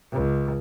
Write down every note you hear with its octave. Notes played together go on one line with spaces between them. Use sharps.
C#2